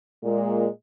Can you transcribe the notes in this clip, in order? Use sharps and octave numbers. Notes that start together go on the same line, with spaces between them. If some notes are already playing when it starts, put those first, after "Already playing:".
A#2 G#3